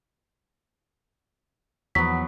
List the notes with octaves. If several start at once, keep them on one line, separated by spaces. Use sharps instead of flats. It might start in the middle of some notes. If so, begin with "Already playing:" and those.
E2 F3 F#3 B3 B6